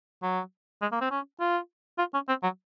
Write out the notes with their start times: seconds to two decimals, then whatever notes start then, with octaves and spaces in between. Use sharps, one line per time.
0.22 F#3
0.82 G#3
0.92 A#3
1.01 C4
1.11 C#4
1.40 F4
1.98 F4
2.14 C#4
2.28 C4
2.43 F#3